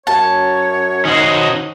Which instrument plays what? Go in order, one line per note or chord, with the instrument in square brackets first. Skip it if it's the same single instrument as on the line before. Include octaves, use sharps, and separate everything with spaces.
[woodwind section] F#2 C#5 [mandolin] A5
[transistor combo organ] D#3 D#4 [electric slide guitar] C#4 F#4 C5